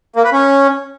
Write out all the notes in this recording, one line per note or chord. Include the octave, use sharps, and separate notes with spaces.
A#3
B4
C#4